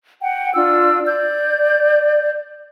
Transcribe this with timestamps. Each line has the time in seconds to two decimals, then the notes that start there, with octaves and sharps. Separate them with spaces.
0.21 F#5 G5
0.55 D4 F4 E6
1.05 D5 G6